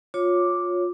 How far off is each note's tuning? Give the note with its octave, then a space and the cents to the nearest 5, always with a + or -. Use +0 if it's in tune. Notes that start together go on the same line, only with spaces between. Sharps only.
F4 +25 C#5 +0 D6 +0